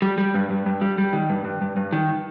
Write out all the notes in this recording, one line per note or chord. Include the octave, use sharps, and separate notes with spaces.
G3
G3
G2
G2
G2
G3
G3
D#3
G2
G2
G2
G2
D#3